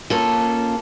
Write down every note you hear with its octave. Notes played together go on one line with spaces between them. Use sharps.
A#3 C#4 F4 A4